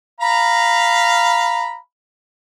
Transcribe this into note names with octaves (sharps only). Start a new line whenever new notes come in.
F5 A#5 B5